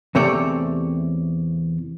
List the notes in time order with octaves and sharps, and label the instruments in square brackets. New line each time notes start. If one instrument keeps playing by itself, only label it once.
[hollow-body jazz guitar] E2 C3 A3 C4 C#5 D5